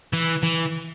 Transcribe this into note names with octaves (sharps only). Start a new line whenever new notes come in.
E3
E3